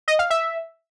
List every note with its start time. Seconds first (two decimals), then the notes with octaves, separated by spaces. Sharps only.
0.08 D#5
0.19 F5
0.30 E5